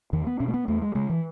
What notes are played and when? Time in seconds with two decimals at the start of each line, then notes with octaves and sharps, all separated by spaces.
0.13 E2 D#3
0.27 B3
0.40 B2 C#4
0.48 A3
0.54 B3
0.68 E2 A3
0.82 G#3
0.95 C#3 G#3
1.10 E3